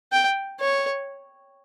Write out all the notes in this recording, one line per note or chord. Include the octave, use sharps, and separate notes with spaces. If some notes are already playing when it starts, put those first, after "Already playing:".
G5
C#5